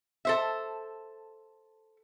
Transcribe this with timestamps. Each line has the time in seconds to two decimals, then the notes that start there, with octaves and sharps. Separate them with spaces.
0.25 A4 C5 E5